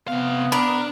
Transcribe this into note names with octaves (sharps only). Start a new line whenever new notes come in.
C3 B3 F5
D4 A#4 B5